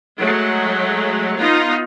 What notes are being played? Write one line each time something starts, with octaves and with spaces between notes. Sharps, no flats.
F#3 G#3 A3
B3 D#4 F4